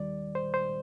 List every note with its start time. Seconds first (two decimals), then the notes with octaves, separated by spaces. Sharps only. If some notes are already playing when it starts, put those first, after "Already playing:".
Already playing: D#2 D#3 G3 D5
0.35 C5
0.54 C5